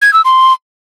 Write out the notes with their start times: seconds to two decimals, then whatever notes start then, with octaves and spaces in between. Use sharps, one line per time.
0.02 G#6
0.13 E6
0.25 C6